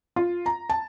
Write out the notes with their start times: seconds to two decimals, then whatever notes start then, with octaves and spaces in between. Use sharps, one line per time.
0.16 F4
0.46 A#5
0.70 A5